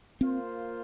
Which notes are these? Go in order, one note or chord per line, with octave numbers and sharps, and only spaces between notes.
A#3 C4 F4 C5